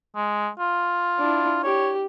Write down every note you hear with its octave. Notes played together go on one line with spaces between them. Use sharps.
G#3
F4
D4 E4
G4 C#5